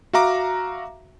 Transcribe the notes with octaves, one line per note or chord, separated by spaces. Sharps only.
F#4 E5 F5 A#5 D6